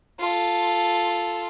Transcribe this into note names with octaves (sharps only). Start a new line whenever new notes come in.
F4 A4